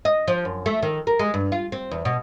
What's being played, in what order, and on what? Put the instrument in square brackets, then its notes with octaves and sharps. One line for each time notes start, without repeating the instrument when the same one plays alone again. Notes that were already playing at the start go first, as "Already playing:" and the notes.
[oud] D#5
F3
F#2
A3
D#3
A#4
G#3
G2
F4
C4
E2
B2